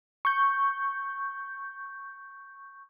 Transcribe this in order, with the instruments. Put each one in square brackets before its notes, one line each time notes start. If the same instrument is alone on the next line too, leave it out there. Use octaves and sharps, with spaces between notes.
[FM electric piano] C#6 G6